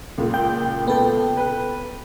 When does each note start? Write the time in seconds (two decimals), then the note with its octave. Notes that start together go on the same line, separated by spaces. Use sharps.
0.18 C#2 A#2
0.34 G5
0.88 B3 A4 G5
1.37 B4